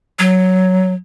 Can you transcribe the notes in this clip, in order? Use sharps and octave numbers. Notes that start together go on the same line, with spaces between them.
F#3